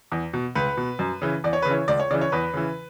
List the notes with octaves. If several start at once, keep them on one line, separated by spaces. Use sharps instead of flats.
E2
B2
C#2 B4
B2
F#2
C#3 E3
E2 D5
C#5
C#3 B4
E3 C#5
C#2 D5
C#5
C#3 E3 D5
C#5
E2 B4
C#3 E3